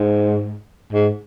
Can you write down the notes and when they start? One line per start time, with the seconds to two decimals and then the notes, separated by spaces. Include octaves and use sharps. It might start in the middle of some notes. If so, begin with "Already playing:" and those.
Already playing: G#2
0.93 G#2